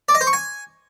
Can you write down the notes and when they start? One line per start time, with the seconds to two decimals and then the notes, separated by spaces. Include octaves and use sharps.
0.09 D5
0.15 D#5
0.21 C5
0.27 C#6
0.33 G#5